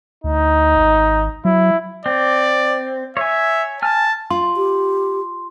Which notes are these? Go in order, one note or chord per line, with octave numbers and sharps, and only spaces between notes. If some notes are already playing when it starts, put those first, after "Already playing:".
D2 D#4
G#1
F#3 E4
C4 D5
C#5 E5 G#5
G#5 A5 F6
F4 C6
G4